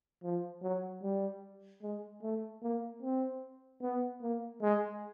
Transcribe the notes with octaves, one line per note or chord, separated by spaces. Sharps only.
F3
F#3
G3
G#3
A3
A#3
C4
B3
A#3
G#3